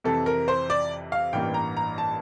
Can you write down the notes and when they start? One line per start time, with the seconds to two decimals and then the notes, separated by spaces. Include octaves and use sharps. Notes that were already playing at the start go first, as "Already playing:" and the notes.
0.04 F2 C3 E3 A4
0.26 A#4
0.48 C5
0.70 D5
1.12 F5
1.33 A1 G2 E3 A#3 G5
1.54 A#5
1.77 A#5
1.98 A5